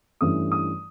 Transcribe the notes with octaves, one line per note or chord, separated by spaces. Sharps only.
G2 E3 A3 C#4 D#6
D#6